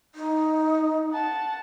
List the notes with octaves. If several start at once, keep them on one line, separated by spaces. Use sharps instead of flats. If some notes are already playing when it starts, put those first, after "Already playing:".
D#4
F#5 A5